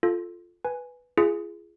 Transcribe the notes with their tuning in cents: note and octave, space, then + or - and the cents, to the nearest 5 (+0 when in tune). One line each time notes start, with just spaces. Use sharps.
F4 +0 A4 -5
B4 +0 G#5 +0
F4 -35 G#4 +0